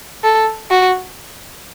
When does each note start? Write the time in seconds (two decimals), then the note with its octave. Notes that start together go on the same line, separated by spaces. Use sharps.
0.24 A4
0.71 F#4